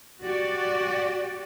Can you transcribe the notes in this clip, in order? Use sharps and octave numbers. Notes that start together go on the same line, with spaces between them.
F#4 G4 D5